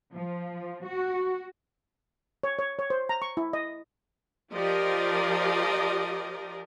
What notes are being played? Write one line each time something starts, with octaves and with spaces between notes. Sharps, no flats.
F3
F#4
C#5
C#5
C#5
C5
A#5
C#6
E4
D#5
F3 G4 A#4 D5 D#5